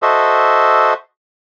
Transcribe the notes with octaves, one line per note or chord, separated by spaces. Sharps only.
F#4 A4 C5 D#5 E5